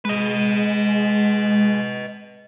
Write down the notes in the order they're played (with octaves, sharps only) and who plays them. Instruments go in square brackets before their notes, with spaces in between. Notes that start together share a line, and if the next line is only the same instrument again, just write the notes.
[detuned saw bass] G#3 [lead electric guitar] B4 D#5